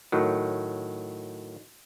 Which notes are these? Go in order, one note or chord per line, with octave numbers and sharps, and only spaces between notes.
A2 D#3 F#3